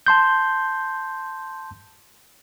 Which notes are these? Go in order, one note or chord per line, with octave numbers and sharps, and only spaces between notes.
A5 C6 G6